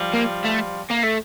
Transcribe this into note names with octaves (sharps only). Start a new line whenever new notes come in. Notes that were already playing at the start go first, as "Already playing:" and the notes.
Already playing: F3 G3
A#3
A3
A#3
A3